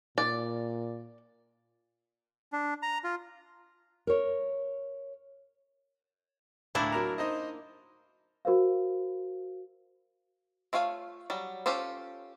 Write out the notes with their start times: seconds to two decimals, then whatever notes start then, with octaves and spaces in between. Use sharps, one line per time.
0.18 A#2 D5
2.53 D4
2.83 A#5
3.04 F4
4.07 A#4 C#5
6.75 D2 A2 A#3 D4 E4
6.92 F#3 A#4 A#5
7.18 D#4 C5 D#5
8.45 F#4 A#4 C5 F5
10.73 A3 F4 C#5 F5 G#5
11.30 F#3 G3
11.66 C#4 F4 G4 A4 C5